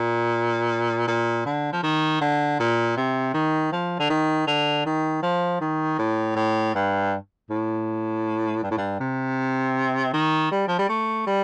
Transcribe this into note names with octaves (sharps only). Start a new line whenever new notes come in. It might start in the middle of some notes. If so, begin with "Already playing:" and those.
Already playing: A#2
A#2
D3
F3
D#3
D3
A#2
C3
D#3
F3
D3
D#3
D3
D#3
F3
D#3
A2
A2
G2
A2
G2
A2
G2
C3
D#3
G3
F3
G3
A3
G3